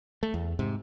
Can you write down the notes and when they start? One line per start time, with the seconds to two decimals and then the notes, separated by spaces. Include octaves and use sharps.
0.23 A3
0.34 E2
0.59 G#2 C3